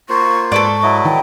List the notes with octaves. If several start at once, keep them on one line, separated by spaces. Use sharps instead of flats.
A#3 F4 C5 C#6
G#2 A4 B4 D5 C#6
F#3 E4 D#5
D#3 E3 G5